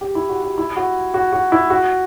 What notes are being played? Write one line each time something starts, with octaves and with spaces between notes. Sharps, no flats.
G4
E4
F#4
F#4
E4
F#4
F#4
F#4
E4
F#4